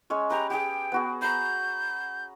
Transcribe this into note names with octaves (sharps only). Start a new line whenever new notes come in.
G#3 C#4 C#5
G4 B4 A#5
G4 G#4 G5
B3 F#4 G#4
A#5 B5 G6